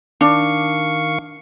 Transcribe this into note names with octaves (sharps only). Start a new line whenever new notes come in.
D#3 D4 F5 C#6